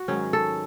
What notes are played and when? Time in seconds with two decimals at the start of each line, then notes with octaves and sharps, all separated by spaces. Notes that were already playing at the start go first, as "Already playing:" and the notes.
Already playing: F#4
0.08 G#2 D#3 F#3 C#4
0.33 A4